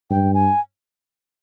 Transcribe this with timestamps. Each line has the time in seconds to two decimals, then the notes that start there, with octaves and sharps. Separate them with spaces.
0.11 G2 G5
0.34 G#5